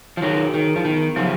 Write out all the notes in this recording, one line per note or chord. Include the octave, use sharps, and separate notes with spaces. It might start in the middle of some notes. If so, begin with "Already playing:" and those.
F3
D#3 F#3 G#4
D#3 G#4
F3
D#3 B3
C#3 F3 F#3